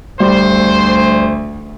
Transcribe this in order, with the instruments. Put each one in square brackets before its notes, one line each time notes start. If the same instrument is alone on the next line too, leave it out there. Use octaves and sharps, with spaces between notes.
[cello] D2 [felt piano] G3 [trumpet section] C5